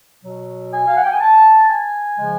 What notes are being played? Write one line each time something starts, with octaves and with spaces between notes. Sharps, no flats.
B2 F#3
G#5
F5
F#5
G5
G#5
A5
G#5
C#3 F3 G#3